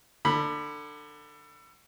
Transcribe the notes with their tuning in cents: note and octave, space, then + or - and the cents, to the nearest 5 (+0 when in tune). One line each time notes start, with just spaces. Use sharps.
D3 +25 B5 +0